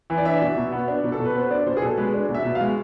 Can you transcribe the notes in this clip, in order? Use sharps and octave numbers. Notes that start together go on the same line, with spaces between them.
E3
D5
D4 E5
B2
B2
B3
D4
B2
A4
B2
B4
B3 C5
D4 D5
B2 C5
G#4
B2 A4
G#3 B4
D4
B2
E5
B2
F5
G#3